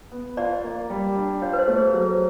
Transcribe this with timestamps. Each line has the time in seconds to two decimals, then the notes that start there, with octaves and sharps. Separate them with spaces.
0.12 B3
0.37 F4 D5
0.64 A#3
0.90 G3
1.16 D4
1.42 F4 C#5
1.53 B4
1.59 C5
1.68 A3
1.76 G#4
1.94 F#3 G#4